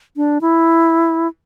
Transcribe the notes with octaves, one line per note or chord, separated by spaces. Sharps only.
D4
E4